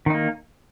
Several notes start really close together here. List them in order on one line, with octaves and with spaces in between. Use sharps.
D#3 D#4 A#3